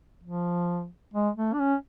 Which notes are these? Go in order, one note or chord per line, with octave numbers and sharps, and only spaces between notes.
F3
G#3
A3
D4
C#4